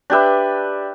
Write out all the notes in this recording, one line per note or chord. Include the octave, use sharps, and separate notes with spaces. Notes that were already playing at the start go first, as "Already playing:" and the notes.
D4 G4 B4 E5